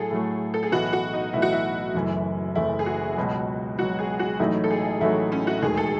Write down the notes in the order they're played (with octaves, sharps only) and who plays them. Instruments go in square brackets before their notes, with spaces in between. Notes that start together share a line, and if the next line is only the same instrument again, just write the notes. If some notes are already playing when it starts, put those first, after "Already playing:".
Already playing: [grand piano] A2 F#3 A3 [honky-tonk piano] G#4 A4
[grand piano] A2 F#3 A3
[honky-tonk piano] A4
G#4
[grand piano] B1 A2 E3 B3 [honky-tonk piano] F#4
[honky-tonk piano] F#4
D#4
[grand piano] B1 A2 E3 B3 [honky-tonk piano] E4
[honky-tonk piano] F#4
E4
[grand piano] F#1 F#2 E3 A3
[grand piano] F#1 F#2 E3 A3 [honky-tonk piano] E4
[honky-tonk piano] G#4
F#4
[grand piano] C#2 B2 F#3
[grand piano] C#2 B2 F#3 [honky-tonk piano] F#4
[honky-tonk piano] G#4
F#4
[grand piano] A1 A2 F#3 A3 D#4 [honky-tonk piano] E4
[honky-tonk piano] A4
G#4
[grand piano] A1 A2 F#3 A3 D#4 [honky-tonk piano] E4
[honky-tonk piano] C#4
F#4
[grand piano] E1 D#2 D#3 A3 [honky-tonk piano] G#4
[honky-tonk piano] A4